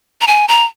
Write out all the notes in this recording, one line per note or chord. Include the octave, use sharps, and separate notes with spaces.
A#5
G#5
A#5